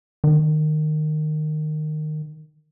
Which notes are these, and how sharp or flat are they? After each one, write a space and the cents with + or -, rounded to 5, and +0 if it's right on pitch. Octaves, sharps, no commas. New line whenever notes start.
D#3 -20